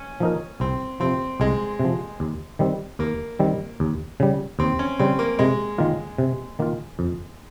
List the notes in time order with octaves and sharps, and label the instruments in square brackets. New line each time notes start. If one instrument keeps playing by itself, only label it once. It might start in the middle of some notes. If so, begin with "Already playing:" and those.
Already playing: [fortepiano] C#4
[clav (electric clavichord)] F3 A#3 D#4 A#4
[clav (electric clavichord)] C2 [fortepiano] C4
[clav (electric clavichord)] C3 F3 [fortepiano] C4
[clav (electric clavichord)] C2 [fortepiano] G#3
[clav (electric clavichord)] C3
F3
D#2
D#3 G3 C4
[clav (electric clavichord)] D#2 [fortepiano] A#3
[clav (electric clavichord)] D#3 G3 C4
D#2
C#3 G3
[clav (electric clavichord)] D#2 [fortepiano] C4
[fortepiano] C#4
[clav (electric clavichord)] C#3 G3 [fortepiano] C4
[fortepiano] A#3
[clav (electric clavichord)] C3 [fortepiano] G#3
[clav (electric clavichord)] D#3 A#3 F4
C3
D#3 A#3 F4
F2